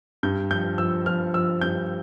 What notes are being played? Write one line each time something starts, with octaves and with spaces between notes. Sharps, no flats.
G2 G6
F3 G6
F3 E6
F3 F6
F3 E6
G2 G6